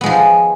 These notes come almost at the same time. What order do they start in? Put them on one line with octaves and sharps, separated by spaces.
B3 G#3 F3